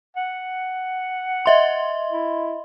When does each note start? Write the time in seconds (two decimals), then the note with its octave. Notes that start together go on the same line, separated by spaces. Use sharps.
0.16 F#5
1.46 D#5 E5 C6
2.10 E4